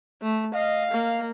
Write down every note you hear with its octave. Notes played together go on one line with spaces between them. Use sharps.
A3
D#5 F5
A#3